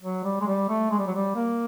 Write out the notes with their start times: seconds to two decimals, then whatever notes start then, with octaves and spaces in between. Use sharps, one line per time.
0.02 F#3
0.24 G3
0.41 G#3
0.47 G3
0.69 A3
0.91 G#3
0.99 G3
1.07 F#3
1.15 G3
1.35 A#3